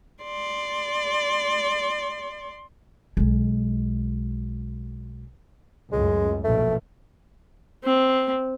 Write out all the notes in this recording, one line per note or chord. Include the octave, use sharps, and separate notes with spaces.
D5 C6
B1 G#3
C#2 F#2 A2 G#3
A#1 B2 A3
C4